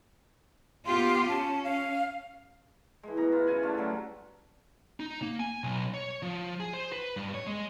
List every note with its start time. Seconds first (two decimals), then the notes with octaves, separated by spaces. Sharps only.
0.86 B3 F4 G4 C6
1.29 C#4 A5
1.64 F5
3.03 E3 G#3
3.17 B2 A#5
3.32 E4 F4
3.47 C#3 G#5 B5
3.63 A3 C#4 D4 F4
3.77 D3 F#3 G3
5.00 D#4
5.22 A#3
5.40 G#5
5.64 B1
5.94 C#5
6.22 F3
6.60 G#4
6.73 C5
6.93 B4
7.17 G2
7.34 C#5
7.47 G#3